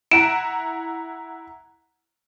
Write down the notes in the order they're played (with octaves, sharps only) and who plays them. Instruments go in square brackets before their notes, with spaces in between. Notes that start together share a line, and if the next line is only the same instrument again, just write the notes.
[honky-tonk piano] E4 F#5 A#5 [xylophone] D7 E7